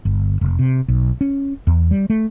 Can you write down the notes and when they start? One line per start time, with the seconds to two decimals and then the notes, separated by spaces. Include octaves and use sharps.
0.05 G1
0.41 F1
0.59 C3
0.88 B1
1.21 C#4
1.67 E2
1.91 G3
2.10 A3